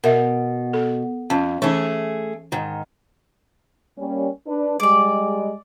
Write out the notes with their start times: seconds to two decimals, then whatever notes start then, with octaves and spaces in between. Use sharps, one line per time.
0.04 B2 A#4 E5
0.73 A4
1.30 F2 C#4
1.62 E3 A3 C#4 D#4 G#4
2.52 G#2 D#3
3.98 G3 A#3 C#4
4.47 D4 B4
4.80 G3 G#3 D5 D6